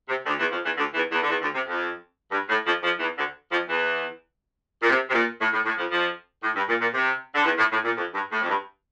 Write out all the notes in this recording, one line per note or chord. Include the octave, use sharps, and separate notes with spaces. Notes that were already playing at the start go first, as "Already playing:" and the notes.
C3
D2 D3
E2 E3
F2 F3
E2 E3
D2 D3
E2 E3
E2 E3
D3
E2 E3
D2 D3
C3
F2
G2
A2
F2 F3
F2 F3
E2 E3
D2 D3
F2 F3
E2 E3
A#2
C3
C3
A#2
A2
A2
A2
F2 F3
F2 F3
A2
G2
A#2
A#2
C3
D3
E2 E3
A2
A2
A#2
F2
G2
A2
F2
G2